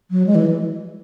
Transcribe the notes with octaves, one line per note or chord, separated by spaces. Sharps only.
F#3
G#3
E3